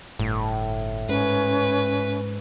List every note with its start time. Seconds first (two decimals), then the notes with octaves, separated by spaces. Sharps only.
0.19 G1 A2
1.09 G#2 C#4 B4